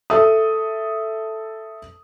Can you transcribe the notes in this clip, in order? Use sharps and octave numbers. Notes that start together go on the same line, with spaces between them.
A4 E5 D#6